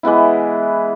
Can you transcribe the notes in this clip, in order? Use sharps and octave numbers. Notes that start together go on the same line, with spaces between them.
E3 G#3 B3 E4